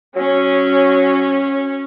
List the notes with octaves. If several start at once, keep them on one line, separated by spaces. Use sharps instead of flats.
F#3 C#4